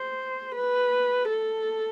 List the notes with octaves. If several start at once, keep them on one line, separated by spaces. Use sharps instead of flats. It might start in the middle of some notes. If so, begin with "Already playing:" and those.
Already playing: C5
B4
A4